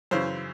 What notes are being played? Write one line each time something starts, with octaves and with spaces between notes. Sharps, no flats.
F#2 C#3 E3 C5